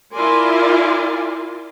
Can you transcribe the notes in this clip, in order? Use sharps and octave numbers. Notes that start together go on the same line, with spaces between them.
E4 F4 A#4 D5 G#5 C6